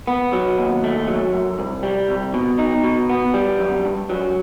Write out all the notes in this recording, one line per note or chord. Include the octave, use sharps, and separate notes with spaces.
B3
F#3
D#2
A3
F#3
F#2
C2
G3
C2
B2
D#4
B2
B3
G3
F#2
G2
F#3